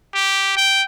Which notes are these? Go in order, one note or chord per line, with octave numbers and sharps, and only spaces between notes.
G4
G5